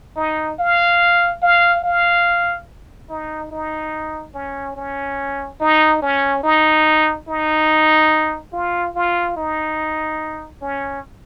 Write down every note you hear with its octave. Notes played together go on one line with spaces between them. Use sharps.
D#4
F5
F5
F5
D#4
D#4
C#4
C#4
D#4
C#4
D#4
D#4
F4
F4
D#4
C#4